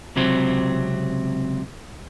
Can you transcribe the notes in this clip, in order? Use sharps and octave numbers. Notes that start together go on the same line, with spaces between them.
C#2 C3 F#3 C4